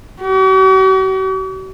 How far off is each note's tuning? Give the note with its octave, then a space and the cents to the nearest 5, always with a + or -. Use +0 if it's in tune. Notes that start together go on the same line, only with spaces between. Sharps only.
F#4 +45